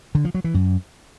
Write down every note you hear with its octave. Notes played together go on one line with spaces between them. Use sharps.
D3
F3
F#3
E3
F#2